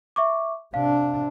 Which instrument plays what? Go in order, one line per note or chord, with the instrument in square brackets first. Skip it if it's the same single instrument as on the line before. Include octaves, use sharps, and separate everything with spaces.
[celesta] E5 C#6 D6
[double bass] C3 D4 [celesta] F5